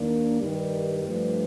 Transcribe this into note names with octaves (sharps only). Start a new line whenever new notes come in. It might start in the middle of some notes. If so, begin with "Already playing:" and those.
Already playing: D#2 D#3 A#3 D4
G2 D#3 G3
G2 F3 A3 D4